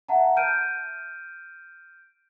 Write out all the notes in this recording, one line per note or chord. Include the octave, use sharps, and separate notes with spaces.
E5 F#5 A5 A#5
F6 G6 D7 D#7